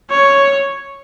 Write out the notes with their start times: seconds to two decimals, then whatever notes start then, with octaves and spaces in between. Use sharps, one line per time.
0.10 C#5